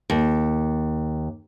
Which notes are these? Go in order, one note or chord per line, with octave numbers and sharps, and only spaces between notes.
D#2